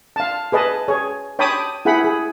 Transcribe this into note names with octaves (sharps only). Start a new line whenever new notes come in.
F5 A5
G#4 B4 D#5 A5
G#4 C#5
C#5 G5 A5 B5 D6 D#6
E4 G#4 F#5 G5 B5
G#4